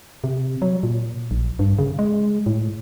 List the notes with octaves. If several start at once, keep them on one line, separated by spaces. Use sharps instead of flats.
C3
F#3
A#2
A#1
G2
C#3
G#3
A2